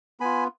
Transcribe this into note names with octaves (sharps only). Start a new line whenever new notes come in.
B3 F4 G#5 B5